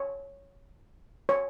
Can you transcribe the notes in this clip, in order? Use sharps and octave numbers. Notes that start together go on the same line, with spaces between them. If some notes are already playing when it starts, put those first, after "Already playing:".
Already playing: C#5
C#5